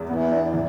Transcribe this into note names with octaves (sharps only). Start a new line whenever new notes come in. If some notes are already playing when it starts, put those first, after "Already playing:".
Already playing: E2
E3 B3
D4
E3